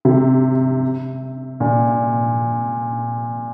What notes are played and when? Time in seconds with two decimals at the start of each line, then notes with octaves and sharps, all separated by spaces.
0.05 C3
1.60 A#2